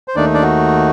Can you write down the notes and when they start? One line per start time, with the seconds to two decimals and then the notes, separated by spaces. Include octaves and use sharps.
0.08 C5
0.16 D#2 D#3 A3 D4 D#4 D5
0.34 D4 D5
0.42 F#4